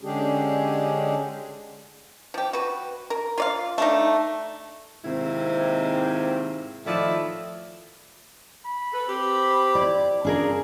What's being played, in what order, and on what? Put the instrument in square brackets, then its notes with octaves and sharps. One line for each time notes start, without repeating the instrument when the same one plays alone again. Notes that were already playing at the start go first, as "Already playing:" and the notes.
[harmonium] D3 G#3 C#4 D4 G4 G#4
[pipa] F3 G4
F#4 B4
A#4
F4 D5 F5
A3 D4 D#4
[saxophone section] G#2 C3 D#3 A#3 C4 E4
A2 D#3 F3 E4 D5 E5
[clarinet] B5
[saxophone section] A4 B4
C4 G4
[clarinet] E4 [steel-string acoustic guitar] D5
[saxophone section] C#3 [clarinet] C#4 [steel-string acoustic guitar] D4 G#4 A#4